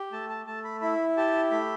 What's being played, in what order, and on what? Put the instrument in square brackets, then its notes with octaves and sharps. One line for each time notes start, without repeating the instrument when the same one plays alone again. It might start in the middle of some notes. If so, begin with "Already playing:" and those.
Already playing: [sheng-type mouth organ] G4
A3 A5
A5
A3 A5
B5
E4 B5
G4 A5
A3 B5